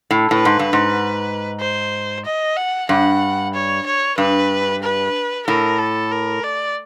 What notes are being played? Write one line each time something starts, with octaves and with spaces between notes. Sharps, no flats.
A2
A2 B4
G#2
G2
G#2
C5
D#5
F#5
G2 F#5
C#5
C#5
G2 B4
B4
A2 A#4
A4
A#4
D5